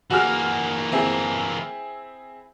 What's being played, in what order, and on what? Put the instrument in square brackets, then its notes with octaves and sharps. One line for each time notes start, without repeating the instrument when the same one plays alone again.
[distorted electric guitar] E3 A#3 [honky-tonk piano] F#4 G#4 F6
[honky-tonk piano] C4 E4 G#4